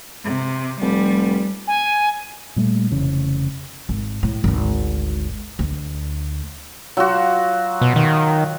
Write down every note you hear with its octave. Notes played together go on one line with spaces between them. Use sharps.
C3
F1 G3
G#5
A#2 G3 A3
F1 D#2 C#3 E3
G#1
A2
G#1 D2
D2
F#3 F4 F#4
B2
D#3